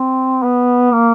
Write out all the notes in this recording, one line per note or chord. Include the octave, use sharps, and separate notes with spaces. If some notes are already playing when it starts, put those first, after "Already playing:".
Already playing: C4
B3
A#3